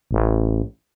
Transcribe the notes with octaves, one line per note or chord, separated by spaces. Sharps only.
A1